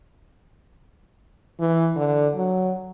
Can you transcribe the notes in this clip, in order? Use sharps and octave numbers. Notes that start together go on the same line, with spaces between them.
E3
D3
F#3